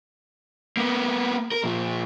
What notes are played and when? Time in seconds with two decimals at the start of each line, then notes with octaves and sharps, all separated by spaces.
0.77 A#3 B3
1.52 A#4
1.64 A#2 F3